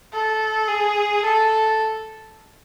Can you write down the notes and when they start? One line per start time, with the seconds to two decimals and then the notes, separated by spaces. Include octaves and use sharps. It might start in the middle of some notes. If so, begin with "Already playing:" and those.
0.13 A4
0.68 G#4
1.24 A4